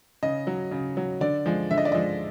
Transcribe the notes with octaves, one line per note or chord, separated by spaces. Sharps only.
C#3 D#5
F#3
C#3
F#3
D3 D5
F3 G#3
D3 E5
D#5
D5
F3 G#3 D#5